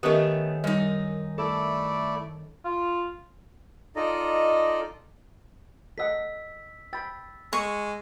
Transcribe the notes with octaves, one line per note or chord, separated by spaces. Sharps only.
D#3 A3 B3 C#4 G4 A#4 D#5
F#2 G3 D#4
A3 E4 A4 D5
F4
D#4 F4 A4 D5 D#5 A#5
A4 D#5 F#5 E6 B6
G5 B5 E6 A6
G#3 C#6